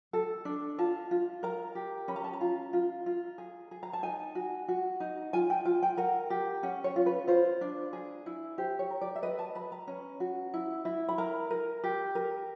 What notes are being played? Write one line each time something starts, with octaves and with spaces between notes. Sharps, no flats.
A4
D4
F4 A5
F4
A#4 A#5
G4
C#4 B5
A#5
A5
A#5
F4
F4
F4
G#4
G#4
A#5
A5
D#4 G#5
F#4
F#4
D#4
F4 G#5
G5
F4 G#5
G5
A#4 F#5
G4
C#4 F#5
C#5
F4
B4
F4 C5
D4
G#4
E4
G4 C5
C#5
A#4
D5
E5
B4 D#5
A5
B4 B5
A#5
C#4
F#4
E4
E4
B5
A#4 A#5
A#4
G4
A#4